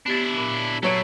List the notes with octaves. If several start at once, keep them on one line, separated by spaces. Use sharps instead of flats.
B3 D4 E4 G4 A6
A#2 B5
F#3 A3 E4 C#5 D7